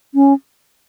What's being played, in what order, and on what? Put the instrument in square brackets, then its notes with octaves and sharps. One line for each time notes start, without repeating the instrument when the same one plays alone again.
[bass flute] C#4